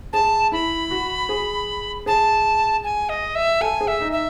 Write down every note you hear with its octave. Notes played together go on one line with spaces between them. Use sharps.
G#4 A5
E4 B5
F#4
G#4
G#4 A5
G#5
D#5
E5
A4 G#5
G#4
E5
D#4
E5